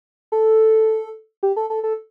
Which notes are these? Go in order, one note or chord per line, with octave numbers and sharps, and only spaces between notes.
A4
G4
A4
A4
A4